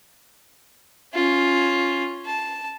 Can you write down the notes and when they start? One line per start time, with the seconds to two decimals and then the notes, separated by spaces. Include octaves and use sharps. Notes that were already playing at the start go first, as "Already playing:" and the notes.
1.14 C#4 F4
2.26 A5